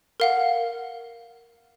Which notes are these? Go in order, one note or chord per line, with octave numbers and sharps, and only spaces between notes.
A#4 F5 F#5